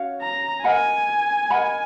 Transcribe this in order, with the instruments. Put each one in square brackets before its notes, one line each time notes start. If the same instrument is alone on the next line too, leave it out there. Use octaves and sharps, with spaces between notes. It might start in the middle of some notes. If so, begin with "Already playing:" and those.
Already playing: [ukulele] C#4 F#4 C#5 F5
[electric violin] A#5
[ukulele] A#4 D#5 F#5 B5 [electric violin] G#5
[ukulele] A#4 D#5 F#5 B5